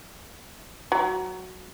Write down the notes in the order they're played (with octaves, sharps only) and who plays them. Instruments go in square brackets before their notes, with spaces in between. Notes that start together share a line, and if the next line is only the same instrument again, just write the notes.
[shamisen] F#3